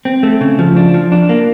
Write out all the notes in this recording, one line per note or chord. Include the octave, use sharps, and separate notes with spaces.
C4
A3
C#3
F3
D4
F3
D4
A#3